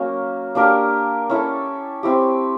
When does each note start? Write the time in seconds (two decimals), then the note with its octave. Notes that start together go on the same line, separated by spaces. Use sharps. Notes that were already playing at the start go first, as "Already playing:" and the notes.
Already playing: F#3 A#3 C#4 F#4 A#4
0.55 A#3 D4 G4 A#4
1.30 C#4 E4 A4
2.03 C4 E4 G4